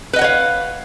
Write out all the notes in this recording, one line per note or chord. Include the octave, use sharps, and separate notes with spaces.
B4 C#5 D#5 F5 F#5